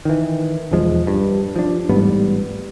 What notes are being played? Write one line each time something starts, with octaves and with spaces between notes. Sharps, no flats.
D#3 E3
B1 E2 F3 G#3
G2
F3 D4
A1 G#2 G3 B3